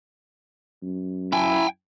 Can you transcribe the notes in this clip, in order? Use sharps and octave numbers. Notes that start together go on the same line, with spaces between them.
F#2
E4 G5 G#5